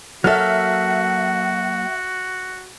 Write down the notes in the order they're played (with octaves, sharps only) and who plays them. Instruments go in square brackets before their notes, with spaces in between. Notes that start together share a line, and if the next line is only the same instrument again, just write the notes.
[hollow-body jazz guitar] F#3 A#3 A4 [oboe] F#4 [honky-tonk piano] E5 F6 [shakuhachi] F#5